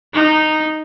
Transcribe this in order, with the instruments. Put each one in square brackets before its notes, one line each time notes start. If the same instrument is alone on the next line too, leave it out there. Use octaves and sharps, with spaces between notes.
[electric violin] D#4